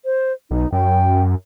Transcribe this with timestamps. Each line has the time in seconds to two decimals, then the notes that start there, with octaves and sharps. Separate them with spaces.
0.05 C5
0.51 B1 D#4
0.72 F#2 G5